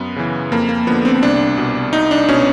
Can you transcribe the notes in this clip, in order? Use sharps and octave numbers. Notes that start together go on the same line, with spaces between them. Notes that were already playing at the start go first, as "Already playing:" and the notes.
Already playing: F#2 B3
C#3 E3
F2 A#3
A#3
D3 F3 B3
C4
C2 D4
B2
C2 D#4
D4
B2 C#4